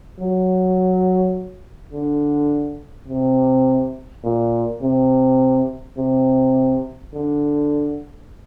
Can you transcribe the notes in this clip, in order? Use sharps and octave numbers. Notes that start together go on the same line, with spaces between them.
F#3
D3
C3
A#2
C3
C3
D3